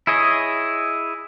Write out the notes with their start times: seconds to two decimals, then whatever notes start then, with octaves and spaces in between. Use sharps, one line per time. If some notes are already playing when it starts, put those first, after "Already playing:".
0.07 E4 G#4 C#5 D#5